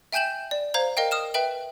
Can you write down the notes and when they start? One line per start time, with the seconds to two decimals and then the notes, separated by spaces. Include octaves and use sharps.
0.12 E5 G5 G#5 G6 E7 F#7
0.51 D5
0.74 C5 F5 A#5 G#6
0.97 A#4 D#5 F5 G5
1.11 D#6 F6 E7
1.34 B4 E5 G5 F#7